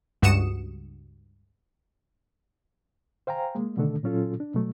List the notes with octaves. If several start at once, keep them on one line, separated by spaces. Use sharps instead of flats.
C#2 G2 F#4 D#6 C#7 E7
C5 F5 G5 G#5 A#5
G#3 A#3
B2 D3 D#3 A3 D4 A4
A#2 F#3 C#4 F4 A4
D4
B2 F#3 A3